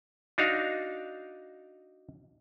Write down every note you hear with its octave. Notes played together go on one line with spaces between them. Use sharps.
D4 D#4 F#4 F5